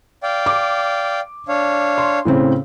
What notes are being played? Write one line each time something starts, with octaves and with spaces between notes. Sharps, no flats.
D5 F5 G5
D6
D4 C#5 F5
C6
A2 C#3 C4